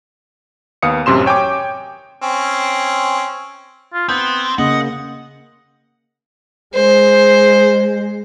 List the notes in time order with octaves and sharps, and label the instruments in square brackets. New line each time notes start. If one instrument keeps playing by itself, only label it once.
[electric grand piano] D#2 B3 F5 D#6 C#7
A1 F#2 C3 C6 E7
C#5 G5 G#5 D6
[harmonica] C4 C#4
[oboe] F4
[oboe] B3 [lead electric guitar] C4 [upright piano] G6
[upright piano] C#3 [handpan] A#3 [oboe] D#5 [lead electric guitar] F#5
[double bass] G#3 [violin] C5